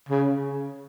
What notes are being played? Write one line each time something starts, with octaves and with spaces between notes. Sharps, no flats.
C#3